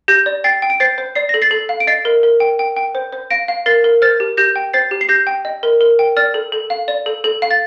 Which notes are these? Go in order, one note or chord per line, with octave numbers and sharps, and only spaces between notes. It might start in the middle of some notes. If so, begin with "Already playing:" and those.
G4 G6 A#6
D5
G5 A6 C7
G5
D7
C5 A6 C7
C5
D5 C7
A4 A#6
A6 C7
A4
F5
D7
D#5 A6 C7
A#4
A#4
G5
G5
G5
C5
C5
F5 A#6 D7
F5
A#4 A6 C7
A#4
C5 F6 A6
G4
G4 G6 A#6
G5
C5 A6 C7
G4
C7
G4 G6 A#6
G5
D#5
A#4
A#4
G5
D5 F6 A6
A4
A4
F5
D5
A4
A4
F5
A6